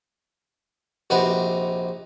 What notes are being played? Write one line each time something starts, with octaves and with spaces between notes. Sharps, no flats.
A#1 C3 D#4 F#4 B4 C5